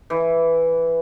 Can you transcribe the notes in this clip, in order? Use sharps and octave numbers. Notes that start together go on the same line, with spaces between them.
E3